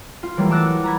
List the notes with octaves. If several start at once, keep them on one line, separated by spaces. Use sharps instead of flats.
F4
E3 F#3 G3 A3 A#3
A5 D6 E6 F#6 A6 A#6
F#4
A#5 B5 G#6